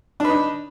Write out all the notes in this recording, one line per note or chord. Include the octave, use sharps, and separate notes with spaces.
D4 D#4 B4